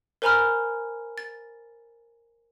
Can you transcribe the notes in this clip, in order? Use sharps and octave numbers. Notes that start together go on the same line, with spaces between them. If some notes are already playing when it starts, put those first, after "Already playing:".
A#4 C5 G#5 A#5 B5 F6
A6